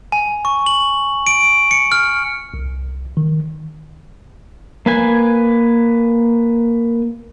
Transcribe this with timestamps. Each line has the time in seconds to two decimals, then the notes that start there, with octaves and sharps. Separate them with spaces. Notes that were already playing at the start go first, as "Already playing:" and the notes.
0.12 G#5
0.45 C#6
0.66 F#7
1.27 D7
1.71 C#7
1.92 F6
2.54 C2
3.17 D#3
4.86 A#3 B4 G#5